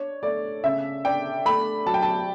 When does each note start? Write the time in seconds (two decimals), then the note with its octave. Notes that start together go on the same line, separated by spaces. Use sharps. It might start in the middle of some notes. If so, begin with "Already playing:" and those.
Already playing: D4 C#5
0.23 A3 D5
0.64 C#3 E5
1.05 D4 G5
1.45 A3 B5
1.86 F#3 A5
1.94 G5
2.02 A5